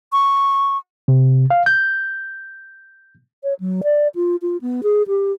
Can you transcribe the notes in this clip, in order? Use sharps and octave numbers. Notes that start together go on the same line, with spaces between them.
C#6
C3
F5
G6
C#5
F#3
D5
F4
F4
B3
G#4
G4